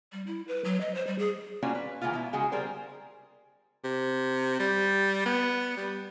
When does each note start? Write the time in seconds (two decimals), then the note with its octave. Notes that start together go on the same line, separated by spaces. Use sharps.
0.12 G3
0.27 E4
0.48 B4
0.65 F#3
0.81 D#5
0.95 C5
1.07 G3
1.19 G#4
1.63 A#3 C#4 D4 F4 F#4
1.75 B4
2.01 D#3 E3 G#3 A#3 B3 F4
2.13 B2 E4
2.33 C#3 G#3 F#4 G#4
2.52 G3 G#4 A#4 C5
3.84 C3
4.60 G3
5.26 B3
5.77 G3